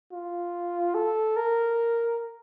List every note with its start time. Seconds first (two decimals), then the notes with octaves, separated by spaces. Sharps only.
0.12 F4
0.95 A4
1.37 A#4